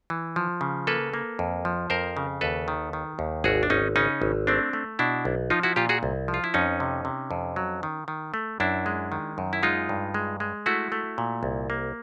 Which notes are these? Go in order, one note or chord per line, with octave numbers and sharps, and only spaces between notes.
E3
F3
C#3
A#3 A4 B4
A#3
F2
F3
F2 A#4 C5
C#3
D#2 A4 B4
D#3
D#3
D#2
G#1 F#4 G#4
D4
G#1 C#4 D#4
C#3 C#4 D#4
G#1
A3 C4 D4
A3
B2 D4 E4
B1
F3 D#4 F4
E4 F#4
A#2 F4 G4
F#4 G#4
C2
F3
F4
E4
F2 C#4 D#4
C3
C3
F2
F#3
D#3
D#3
A3
F#2 D4 E4
G#3
D#3
F#2
E4
G#3 D#4 F4
G2
G#3
G#3
A3 E4 F#4
A3
A#2
C2
A#3